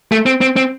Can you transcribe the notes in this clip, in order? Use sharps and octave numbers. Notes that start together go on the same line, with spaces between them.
A3
C4
C4
C4